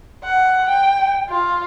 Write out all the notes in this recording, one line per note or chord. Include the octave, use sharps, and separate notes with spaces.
F#5
G5
F4